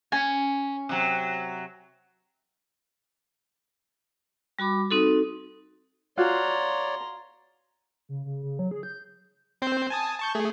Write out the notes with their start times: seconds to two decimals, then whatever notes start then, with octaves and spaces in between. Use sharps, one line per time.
0.12 C#4 G#5
0.89 C3 F#3
4.59 G3 F#4 B5 D6
4.91 C4 D#4 F#4 A4
6.17 F4 F#4 C#5 D5 F5 A#5 C6
8.09 C#3
8.25 C#3
8.43 C#3
8.59 F#3
8.71 G#4
8.83 G6
9.62 C4 C5 G6
9.90 G#5 A5 D#6
10.20 A5 C#6 G6
10.35 A3 G#4